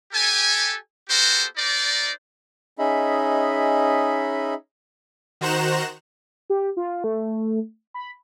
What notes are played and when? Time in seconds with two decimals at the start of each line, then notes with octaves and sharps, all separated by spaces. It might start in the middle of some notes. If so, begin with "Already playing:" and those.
0.13 G4 A4 G#5
1.10 B3 F#4 G4 A4 A#4 C5
1.57 D#4 A#4 C5 D5
2.79 C#4 D#4 G#4 D#5 E5 B5
5.41 D#3 F#4 C5 A#5 F#6 E7
6.50 G4
6.77 F4
7.04 A3
7.94 B5